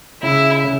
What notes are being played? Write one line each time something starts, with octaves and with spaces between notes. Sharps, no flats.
C#3 E4
C#3